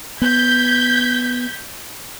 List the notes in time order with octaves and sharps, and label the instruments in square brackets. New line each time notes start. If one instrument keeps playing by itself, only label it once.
[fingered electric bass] B3 [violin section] G6 G#6 B6